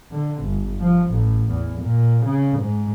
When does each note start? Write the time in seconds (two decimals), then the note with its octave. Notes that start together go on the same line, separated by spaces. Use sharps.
0.12 D3
0.44 G1
0.80 F3
1.11 A1
1.50 E2
1.82 A#2
2.25 C#3
2.59 G#2